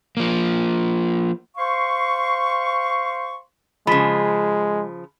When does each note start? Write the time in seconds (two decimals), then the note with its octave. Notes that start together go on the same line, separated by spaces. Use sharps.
0.17 F3 A#3
1.57 C5 F5 C6 C#6
3.87 C#3 F3 G#3 B5 B6